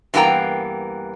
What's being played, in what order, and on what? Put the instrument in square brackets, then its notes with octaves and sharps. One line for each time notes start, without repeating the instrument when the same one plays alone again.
[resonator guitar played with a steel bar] G2 E3 A#3 B3 G5 A#5